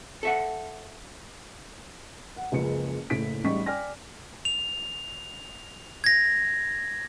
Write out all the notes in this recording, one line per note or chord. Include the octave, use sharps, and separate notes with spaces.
A4 E5 F#5
F#5
F#1 C#2 F3 G#3 B4 C#7
F#1 A2 B6 D7
A1 G#2 G3 D#5 C#6 B6
D5 G5 G#5 F6 A#6
F7
G#6 A#6